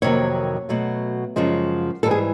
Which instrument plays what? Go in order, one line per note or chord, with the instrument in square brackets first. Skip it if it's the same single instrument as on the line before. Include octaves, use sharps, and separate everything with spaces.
[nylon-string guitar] F2 C3 D#3 F#3 A#3 C#5
B2 F#3 A3
F#2 C#3 F3 G#3
G#2 E3 G3 A4
G#4